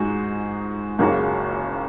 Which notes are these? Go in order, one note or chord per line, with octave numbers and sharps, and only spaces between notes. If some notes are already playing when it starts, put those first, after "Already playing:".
Already playing: G#2 G#3 D#4 F#4
F#1 F#2 C#3 A#3 F#4